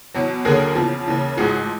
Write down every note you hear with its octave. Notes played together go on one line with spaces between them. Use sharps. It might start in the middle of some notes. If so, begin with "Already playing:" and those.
E2 B2 F#3
D#2 D3 F#3 G#4 A#4
E2 C#3 F3
D#2 C#3 E3
A1 G#2 F3 F#4 G#4